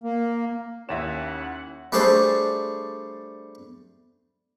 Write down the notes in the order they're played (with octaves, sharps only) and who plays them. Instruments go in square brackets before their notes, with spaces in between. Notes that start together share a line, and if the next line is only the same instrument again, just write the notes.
[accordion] A#3
[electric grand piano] D#2 E7 [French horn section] C#4 E4 [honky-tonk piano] C#5 E5 [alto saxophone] F#5
[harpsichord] G3 A3 D4 G#4 A4 C5